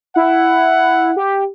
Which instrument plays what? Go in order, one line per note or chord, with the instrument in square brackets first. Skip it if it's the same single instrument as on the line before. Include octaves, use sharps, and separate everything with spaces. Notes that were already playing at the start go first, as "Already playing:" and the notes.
[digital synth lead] E4 [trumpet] F#5
[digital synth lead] G4